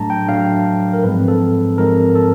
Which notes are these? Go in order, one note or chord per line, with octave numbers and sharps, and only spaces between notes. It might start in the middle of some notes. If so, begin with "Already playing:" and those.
Already playing: A2 F#3 A3 D4 A5 A#5
G5
A2 F#3 A3 D4 F5
A#4
G#2 F3 G#3 C4 B4
A4
G#2 F3 G#3 C4 A#4
A4